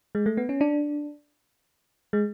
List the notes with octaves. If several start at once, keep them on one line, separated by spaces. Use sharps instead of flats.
G#3
A3
B3
C#4
D4
G#3